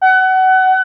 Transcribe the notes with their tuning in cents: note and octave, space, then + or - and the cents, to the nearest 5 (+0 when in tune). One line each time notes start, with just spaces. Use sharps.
F#5 +25